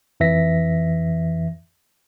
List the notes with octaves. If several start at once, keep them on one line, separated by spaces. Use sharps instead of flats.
F2 E3 E5 A#6 B6